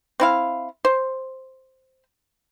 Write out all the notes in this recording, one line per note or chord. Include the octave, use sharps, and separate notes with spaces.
C4 E4 F5
C5